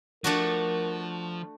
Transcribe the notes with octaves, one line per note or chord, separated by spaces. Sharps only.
F3 A3 D4 F#4 A#4